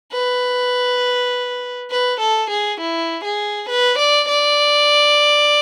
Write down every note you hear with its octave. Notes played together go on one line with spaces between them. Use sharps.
B4
B4
A4
G#4
E4
G#4
B4
D5
D5